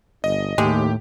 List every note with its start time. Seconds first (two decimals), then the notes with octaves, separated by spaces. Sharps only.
0.24 G1 D#5
0.58 D#2 A2 G#3 G4